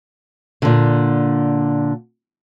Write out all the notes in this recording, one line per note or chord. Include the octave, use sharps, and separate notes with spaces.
A#2 D3